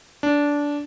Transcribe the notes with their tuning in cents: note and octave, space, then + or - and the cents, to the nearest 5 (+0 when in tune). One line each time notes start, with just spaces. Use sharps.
D4 -15